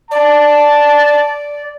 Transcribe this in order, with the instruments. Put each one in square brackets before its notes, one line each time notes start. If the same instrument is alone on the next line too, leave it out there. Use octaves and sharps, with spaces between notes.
[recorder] D5 [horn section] A5